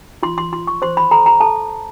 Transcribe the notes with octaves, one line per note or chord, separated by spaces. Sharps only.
F4 C6
C6
F4 C6
C#6
C5 C6
B5
A4 A#5
A#5
A4 A5